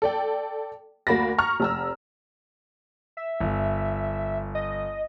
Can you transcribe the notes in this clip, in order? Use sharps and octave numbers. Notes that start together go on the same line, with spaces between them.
A4 D5 G5
D2 A#3 F#4 B5 A6 A#6
A#5 C#6 F6
F1 A#5 E6
E5
G1
D#5